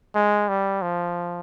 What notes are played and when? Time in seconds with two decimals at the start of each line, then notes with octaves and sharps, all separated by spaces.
0.15 G#3
0.49 G3
0.82 F3